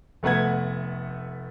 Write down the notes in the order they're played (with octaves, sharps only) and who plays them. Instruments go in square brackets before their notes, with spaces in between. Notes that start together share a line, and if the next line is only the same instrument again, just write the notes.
[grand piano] F1 A3 B3 F#5 G#6